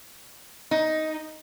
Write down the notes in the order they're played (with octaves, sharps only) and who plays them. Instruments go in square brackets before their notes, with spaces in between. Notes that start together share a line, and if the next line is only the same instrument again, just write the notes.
[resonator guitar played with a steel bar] D#4